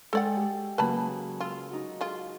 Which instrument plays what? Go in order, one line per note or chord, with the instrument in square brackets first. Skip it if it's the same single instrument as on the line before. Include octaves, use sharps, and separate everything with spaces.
[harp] G#3 G5 [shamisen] A4 D5 F#5
[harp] G4
[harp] C#3 F#3 A#3 [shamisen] B4 A5 B5
[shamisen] F4 [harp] E6 F6
[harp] D#4 F#4
[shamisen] G#3 F4